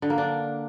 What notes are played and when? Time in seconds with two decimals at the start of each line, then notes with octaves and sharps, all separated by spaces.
0.02 D3
0.10 A#3
0.18 D4